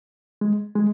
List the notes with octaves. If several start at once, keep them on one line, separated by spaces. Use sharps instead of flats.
G#3
G#3